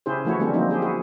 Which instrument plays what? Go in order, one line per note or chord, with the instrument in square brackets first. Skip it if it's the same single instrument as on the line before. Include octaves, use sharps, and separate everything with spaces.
[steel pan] C#3 C#4 E4 G4 G#4 C5
E3 F3 A3 E4 F#4 C#5
D3 G3 A3 C4 C#4
F3 F#3 A#3 C4 D#4
C#4 G4 G#4 C5
E4 F#4 G#4